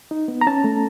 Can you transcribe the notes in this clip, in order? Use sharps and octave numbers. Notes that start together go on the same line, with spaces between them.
D#4
B3
A#5
C#4 A5
A3